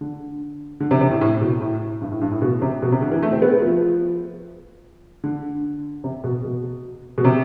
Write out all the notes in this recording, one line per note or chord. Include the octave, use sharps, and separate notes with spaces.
D3
D3
C3
C3
A2
A2
B2
A2
G2
A2
G2
A2
B2
C3
B2
C3
D3
E3
A3
C4
B3
B3
F3
D3
C3
B2
B2
B2
C3